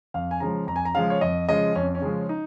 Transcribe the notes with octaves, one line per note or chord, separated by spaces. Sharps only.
F2 F5
G#5
C#3 F3 G#3 A#5
F2 A#5
G#5
A#5
C#3 F3 G#3 F5
C#5
F2 D#5
C#3 F3 G#3 D#5
F2 C#4
C#4
C#3 F3 G#3
D#4